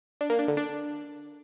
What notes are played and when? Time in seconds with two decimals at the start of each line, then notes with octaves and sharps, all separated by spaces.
0.21 D4
0.30 A#3
0.39 D4
0.48 D3
0.57 D4